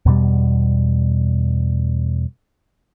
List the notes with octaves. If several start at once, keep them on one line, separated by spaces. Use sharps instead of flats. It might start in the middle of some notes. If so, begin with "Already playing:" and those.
E2 B2 G3